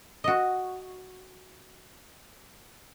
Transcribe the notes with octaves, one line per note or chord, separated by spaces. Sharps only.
F#4 D#5